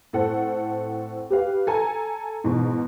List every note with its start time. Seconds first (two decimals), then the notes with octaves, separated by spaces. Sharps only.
0.13 A2 C4 A4 F#5
1.30 G4 B4 F5
1.67 A4 G#5 A#5
2.44 G#2 B2 E3